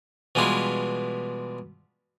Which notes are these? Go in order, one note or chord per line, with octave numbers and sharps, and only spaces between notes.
B2 E3 G3 G#3 E4 F4